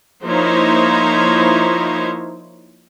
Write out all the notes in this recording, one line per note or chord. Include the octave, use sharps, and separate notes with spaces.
F3 A#3 D#4 E4 C5 C#5